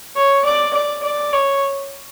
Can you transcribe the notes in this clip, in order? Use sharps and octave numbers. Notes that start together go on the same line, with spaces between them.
C#5
D5
D5
D5
C#5